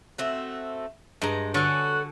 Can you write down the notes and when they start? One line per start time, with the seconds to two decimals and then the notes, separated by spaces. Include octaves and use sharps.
0.18 A3 C4 F#4
1.22 G2 G#3 A#5
1.54 D3 F#4 A4 B4 C#5 G#5